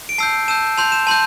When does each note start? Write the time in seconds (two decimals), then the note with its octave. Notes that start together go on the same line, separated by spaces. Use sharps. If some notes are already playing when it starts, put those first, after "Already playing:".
0.09 D7
0.18 A5 E6 G6 C7
0.48 A5 E6 G6 E7
0.77 A5 C6 G6 F7
0.92 E7
1.07 A5 C6 G6